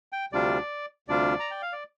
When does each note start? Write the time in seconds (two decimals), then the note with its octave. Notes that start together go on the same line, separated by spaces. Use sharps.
0.12 G5
0.32 D2 C3 G3 D4 F4 D5
1.08 D2 C3 G3 D4 F4 D5
1.40 A#5
1.51 G5
1.62 F5
1.72 D5